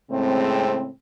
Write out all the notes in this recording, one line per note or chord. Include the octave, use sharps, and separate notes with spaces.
A2 C#3 G#3 C4